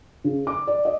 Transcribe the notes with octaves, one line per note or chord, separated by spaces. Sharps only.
C#3
D6
D5
D#5